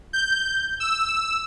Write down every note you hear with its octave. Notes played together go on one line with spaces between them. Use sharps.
G6
E6